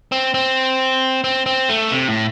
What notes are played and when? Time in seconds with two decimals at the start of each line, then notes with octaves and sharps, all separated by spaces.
0.12 C4
0.34 C4
1.24 C4
1.46 C4
1.69 A3
1.91 C3
2.08 A2